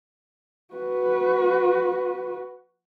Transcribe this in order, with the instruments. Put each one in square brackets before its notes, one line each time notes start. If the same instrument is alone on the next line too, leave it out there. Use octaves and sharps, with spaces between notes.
[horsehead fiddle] F#4 B4